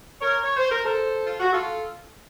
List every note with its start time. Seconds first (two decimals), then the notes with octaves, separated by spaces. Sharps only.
0.21 A#4 C#5
0.43 C#5
0.57 C5
0.70 A#4
0.84 A4 C5
1.26 F4
1.39 F#4
1.52 F4 A4